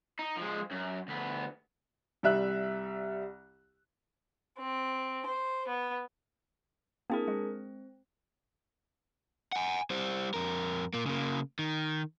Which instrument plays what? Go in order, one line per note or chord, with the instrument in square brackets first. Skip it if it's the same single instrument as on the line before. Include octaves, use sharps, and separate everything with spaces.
[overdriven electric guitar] D#4
F3 G#3
F#2
D2 B3
[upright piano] C2 G3 E5 F#6
[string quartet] C4
C5
B3
[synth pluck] A#3 C4 E4 [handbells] D4 G#4 A#4
[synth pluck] G#3 [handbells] C4
[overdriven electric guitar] F#5 G#5
G3 C5
F2 A#4
A#2 A#3
C#3 A#3
D#3